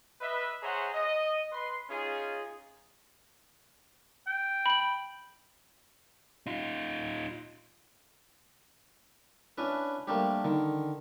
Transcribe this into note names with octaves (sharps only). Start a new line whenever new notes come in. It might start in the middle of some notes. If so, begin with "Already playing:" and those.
B4 D#5 E5
G#4 C5 C#5 E5 F#5 A#5
D#5
B4 C6
C#4 D#4 F4 G#4
G5
B5 F#7
D#4 F4
C#4 D4 E4 B4
G3 A3 A#3 C4 D4 G4
D3 D#3